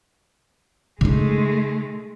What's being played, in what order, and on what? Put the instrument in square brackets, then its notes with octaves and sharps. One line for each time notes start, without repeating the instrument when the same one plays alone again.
[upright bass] C#3 D#4 [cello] G#3 A3